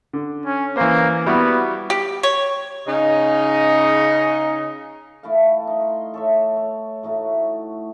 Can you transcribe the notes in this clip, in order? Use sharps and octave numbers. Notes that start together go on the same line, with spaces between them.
D3
C#4
E3 A#3 C#4 C5
G3 B3 E4 F#4
G4
C#5
C#3 D#4 D#5
A3 E4 A4 F5
D#4 D#5
C6
A4 C#5 E5
C#5
A2 A3 D#4 F#4